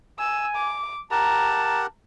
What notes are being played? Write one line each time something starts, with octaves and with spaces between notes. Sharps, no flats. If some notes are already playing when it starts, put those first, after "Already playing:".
G#5 E6
D6
G4 A#4 F#5 A5 A#5